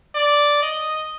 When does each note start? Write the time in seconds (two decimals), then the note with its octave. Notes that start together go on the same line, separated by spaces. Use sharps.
0.15 D5
0.63 D#5